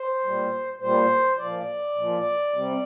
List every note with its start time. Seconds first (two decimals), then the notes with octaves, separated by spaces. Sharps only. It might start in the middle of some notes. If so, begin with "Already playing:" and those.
Already playing: C5
0.24 A#2 G3
0.81 A#2 G3 C5
1.38 A#2 F3 D5
1.95 A#2 F3
2.53 C3 G3